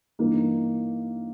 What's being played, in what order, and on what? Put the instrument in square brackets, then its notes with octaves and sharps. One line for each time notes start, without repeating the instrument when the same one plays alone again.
[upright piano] G2 E3 A#3 D#4